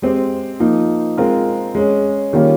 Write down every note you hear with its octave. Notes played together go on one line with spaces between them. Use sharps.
G#3 C4 G4 C5
F3 A#3 D#4
G#3 C4 F4 A#4
G#3 C#4 G#4
D#3 G3 A#3 C#4 F4